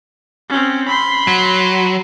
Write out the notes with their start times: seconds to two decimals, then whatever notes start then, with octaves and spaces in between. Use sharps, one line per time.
0.49 C4 C#4
0.88 B5 C6
1.27 F#3